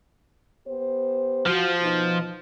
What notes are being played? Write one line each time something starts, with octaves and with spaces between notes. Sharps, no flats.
B3 G4 C5
F3 F#4
B2 B3 D#4